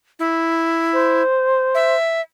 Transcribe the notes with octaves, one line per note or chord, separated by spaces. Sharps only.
E4
C5
E5